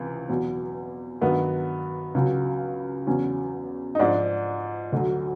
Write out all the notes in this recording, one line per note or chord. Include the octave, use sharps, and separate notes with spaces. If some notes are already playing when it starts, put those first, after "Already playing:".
Already playing: C#2 C3 E3
E2 B2 F#3
G2 D#3 F#3 B3
C#2 C#3 F#3
E2 C#3 F#3 C#4
D#4
G#2 F3 D4
D2 D3 F#3